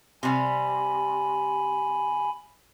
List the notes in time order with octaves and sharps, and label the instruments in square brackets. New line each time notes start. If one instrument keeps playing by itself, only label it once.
[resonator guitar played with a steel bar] C3 G3 [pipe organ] G#5 B5